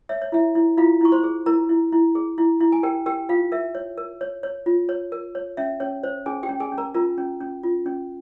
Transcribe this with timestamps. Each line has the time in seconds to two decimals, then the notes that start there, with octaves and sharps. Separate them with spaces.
0.09 C#5 E5
0.22 C#5
0.32 E4 E5
0.55 E4
0.78 E4 F4 F5
1.01 E4 C#6
1.12 C5 C6
1.23 G#4
1.46 E4 A#4 A#5
1.69 E4
1.92 E4
2.15 G#4
2.38 E4
2.61 E4
2.72 G#5
2.83 G4 A#4 G5
3.06 G4 A#4 G5
3.29 F4 F5
3.52 A#4 E5
3.75 C#5
3.98 A#4
4.21 C#5
4.43 C#5
4.66 F4
4.89 C#5
5.12 A#4
5.35 C#5
5.57 C#4 E5
5.80 C#4 C#5
6.03 C5 C#5
6.26 C#4 G#4 G#5
6.43 G4 G5
6.49 C#4
6.60 G#4 G#5
6.72 C#4
6.78 A#4 A#5
6.94 F4 A#4 A#5
7.18 C#4
7.41 C#4
7.63 F4
7.86 C#4